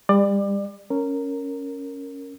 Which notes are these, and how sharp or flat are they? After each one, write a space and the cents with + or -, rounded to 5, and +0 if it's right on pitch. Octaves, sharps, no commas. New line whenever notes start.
G3 +35 D5 +25
C#4 +0 A#4 -10